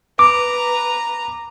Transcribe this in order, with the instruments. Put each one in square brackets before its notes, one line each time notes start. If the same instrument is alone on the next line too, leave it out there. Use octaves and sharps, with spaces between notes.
[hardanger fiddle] B4 A#5 [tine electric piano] D6